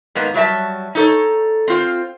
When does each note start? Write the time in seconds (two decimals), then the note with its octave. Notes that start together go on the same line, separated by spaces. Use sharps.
0.15 G#2 A#3 B3
0.34 F#3 G3 E5 A5
0.95 D#4 A4 C#5
1.68 C4 F4 C5